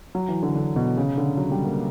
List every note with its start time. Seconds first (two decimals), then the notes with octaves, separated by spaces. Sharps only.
0.15 F#3
0.28 E3
0.42 D3
0.56 D3
0.76 B2
0.97 C#3
1.18 D3
1.37 F#3
1.52 G3
1.64 A#3